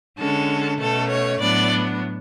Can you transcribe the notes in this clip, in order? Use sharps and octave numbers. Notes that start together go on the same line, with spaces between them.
D3 G#3 C#4 A4
B2 A3 C#4 A4
C#5
A2 F#3 B3 D4 D5